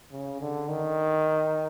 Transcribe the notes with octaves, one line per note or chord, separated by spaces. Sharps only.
C#3
D3
D#3